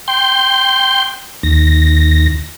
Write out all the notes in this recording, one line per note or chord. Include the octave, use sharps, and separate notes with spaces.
G5 C6 G6
D#2 A#6